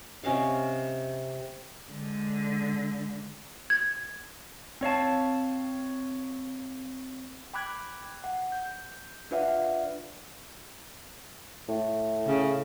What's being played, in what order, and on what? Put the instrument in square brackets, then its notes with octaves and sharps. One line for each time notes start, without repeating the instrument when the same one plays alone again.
[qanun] C3 C#4 D#5 F5
[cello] D3 G#3
[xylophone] G#6
[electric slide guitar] C4 C#5 F5 A5
[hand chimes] G5 B5 D6 F#6 G#6
F#5
G6
D4 F4 B4 D5 E5 F#5
[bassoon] A2
[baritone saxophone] C#3